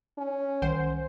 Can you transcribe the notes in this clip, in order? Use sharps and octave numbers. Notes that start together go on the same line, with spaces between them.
C#4
C2 D#3 C5 F#5